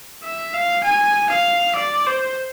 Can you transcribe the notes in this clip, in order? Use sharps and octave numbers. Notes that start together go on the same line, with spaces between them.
E5
F5
G#5
F5
D5
C5